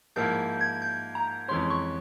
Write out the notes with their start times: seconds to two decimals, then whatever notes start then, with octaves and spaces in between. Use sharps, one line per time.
0.16 G#2 F3 A#3 E4 G6
0.61 G#6
0.82 G6
1.15 A#5
1.48 F2 E3 G#3 C#4 C6
1.70 C#6